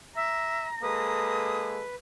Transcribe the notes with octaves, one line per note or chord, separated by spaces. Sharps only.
E5 A#5
G#3 A#3 A4 B4 D#6